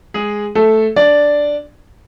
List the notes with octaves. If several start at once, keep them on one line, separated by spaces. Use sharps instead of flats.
G#3 G#4
A3 A4
D4 D5